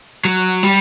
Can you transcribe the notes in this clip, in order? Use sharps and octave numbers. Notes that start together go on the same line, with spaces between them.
F#3
G3